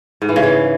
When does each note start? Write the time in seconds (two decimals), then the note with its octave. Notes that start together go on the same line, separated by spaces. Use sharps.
0.22 G#2
0.29 E3
0.36 C#3
0.43 E3